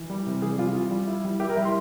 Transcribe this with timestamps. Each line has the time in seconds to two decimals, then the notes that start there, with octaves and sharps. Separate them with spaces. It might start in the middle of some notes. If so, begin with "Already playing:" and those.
Already playing: E3
0.10 G3
0.26 C3
0.42 E3 G#4
0.58 G3 F4
0.75 F4
0.91 G3
1.07 E4
1.25 G3
1.40 E4 G4
1.49 A#4
1.56 G3 E5
1.65 C6